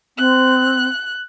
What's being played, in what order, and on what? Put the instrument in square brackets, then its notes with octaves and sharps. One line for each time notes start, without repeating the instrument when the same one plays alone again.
[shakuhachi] C4 [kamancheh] F#6